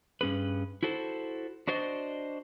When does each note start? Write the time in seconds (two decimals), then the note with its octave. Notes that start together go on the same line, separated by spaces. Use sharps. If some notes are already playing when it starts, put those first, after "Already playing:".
0.21 G2 C#4 G#4 B4
0.83 E4 F#4 A4 C5
1.68 D4 F#4 C5 D5 D#5